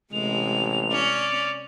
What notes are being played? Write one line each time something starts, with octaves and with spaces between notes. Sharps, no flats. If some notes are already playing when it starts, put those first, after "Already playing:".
A1 C3 G#3 F7
C#4 D5